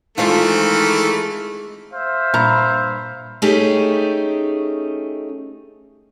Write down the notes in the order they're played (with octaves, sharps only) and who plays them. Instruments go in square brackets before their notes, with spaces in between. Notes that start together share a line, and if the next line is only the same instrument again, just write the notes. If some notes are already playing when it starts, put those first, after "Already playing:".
[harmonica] D#3 E3 A3 [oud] G#3 C4 F4
[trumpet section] C5 E5 F5
[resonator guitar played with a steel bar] G2 A#5 [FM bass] A#2
[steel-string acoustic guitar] A3 C#4 D#4 G4 G#4